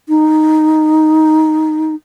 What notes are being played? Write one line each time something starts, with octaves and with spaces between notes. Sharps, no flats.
D#4